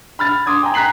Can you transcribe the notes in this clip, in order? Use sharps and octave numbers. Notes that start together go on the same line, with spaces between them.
B5 F6 A6
C6 D6 D#6 G#6
G5 G#5 A#5
A#5 F#6 B6 C7 F#7